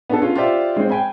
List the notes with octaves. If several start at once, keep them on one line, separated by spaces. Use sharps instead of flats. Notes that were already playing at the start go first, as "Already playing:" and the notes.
B3 D4 F#4 G#4 A4
C#4 F4
F4 G4 C5 D5 E5 F5
G#3 C4
G5 G#5 B5